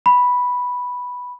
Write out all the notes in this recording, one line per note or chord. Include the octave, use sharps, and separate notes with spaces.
B5